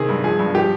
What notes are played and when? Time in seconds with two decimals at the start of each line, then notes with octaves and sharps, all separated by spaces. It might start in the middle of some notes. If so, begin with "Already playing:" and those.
Already playing: C3 D#3 G#4
0.09 G2
0.24 F3 G#4
0.39 G2
0.55 F3 G4